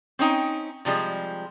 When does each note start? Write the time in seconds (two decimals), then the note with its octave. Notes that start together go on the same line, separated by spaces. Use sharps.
0.19 C4 C#4 D#4 G5
0.85 C3 F3 G3 G#3